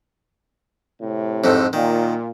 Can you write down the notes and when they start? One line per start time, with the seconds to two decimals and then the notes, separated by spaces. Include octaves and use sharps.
1.01 A2 C3
1.44 F2 G#2 A3
1.73 A#2 D#3